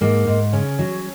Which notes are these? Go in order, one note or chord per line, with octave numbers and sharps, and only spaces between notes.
G#2 A#3
G#2
C#3 C#4
F#3